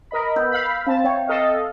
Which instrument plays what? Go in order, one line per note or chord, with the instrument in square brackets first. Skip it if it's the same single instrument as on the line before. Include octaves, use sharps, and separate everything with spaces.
[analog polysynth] A#4 D#5 B5
[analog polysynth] B3 [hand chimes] E6 G6
[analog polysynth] F5 B5
[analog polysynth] C4 A5 [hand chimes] F5
[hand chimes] C4 E5 G5 [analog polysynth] C#5
[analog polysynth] A4 D#5 F5